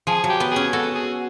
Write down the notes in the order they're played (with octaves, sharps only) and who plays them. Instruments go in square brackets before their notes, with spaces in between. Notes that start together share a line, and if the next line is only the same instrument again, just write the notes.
[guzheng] F3 [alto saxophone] G#4
[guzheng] F#3
[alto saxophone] G4
[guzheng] B3
[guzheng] C#4 [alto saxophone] G#4
[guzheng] F#4 [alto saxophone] A4
[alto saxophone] G#4